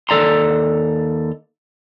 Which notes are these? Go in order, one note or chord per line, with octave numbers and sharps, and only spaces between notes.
D#2 A4 D5 A#5 C6